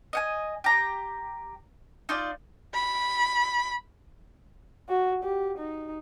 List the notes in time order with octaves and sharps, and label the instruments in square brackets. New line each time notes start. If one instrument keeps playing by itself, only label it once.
[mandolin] D#5 F#5 G#5
G4 A#5
D#4 F4 D5
[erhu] B5
[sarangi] F#4
G4
D#4